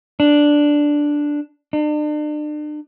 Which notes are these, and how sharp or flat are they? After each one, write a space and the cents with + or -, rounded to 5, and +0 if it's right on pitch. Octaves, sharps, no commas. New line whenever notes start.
D4 +0
D4 +40